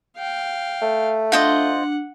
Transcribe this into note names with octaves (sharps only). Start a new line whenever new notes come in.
F5 G5
A3
D4 F4 C5 D#5 F#5